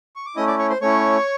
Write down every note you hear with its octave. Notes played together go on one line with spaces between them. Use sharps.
C#6
D6
A3 C#4 E4 D#5 D#6
D5 D6
C#5 C#6
C5 C6
A3 C#4 E4 C#5 C#6